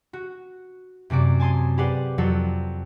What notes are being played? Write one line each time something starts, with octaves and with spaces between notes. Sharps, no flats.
F#4
F#2 C3 F#4 D5 D7
G#5 A5 C6 D#6
G4 G#4 B4 C5 D5 F#5
F2 F#3 F#4 A4 C5